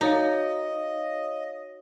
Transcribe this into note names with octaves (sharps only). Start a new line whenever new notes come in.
D#4 F#4 C#5 D#5 F5